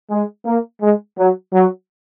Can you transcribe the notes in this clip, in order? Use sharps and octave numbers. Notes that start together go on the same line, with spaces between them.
G#3
A#3
G#3
F#3
F#3